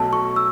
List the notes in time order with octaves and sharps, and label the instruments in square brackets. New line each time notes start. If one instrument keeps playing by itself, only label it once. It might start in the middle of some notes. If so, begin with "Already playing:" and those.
Already playing: [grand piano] B1 B2 F#3 A3 [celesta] A5
[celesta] C#6
E6